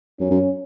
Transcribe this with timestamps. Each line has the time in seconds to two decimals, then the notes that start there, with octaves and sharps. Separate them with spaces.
0.20 F#2 C#4
0.31 F#2